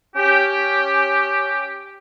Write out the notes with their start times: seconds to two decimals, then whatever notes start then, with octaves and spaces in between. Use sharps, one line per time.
0.16 C#4 G4